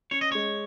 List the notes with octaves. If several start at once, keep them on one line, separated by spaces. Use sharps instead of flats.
C#4 C#5
D#5
G#3 C#5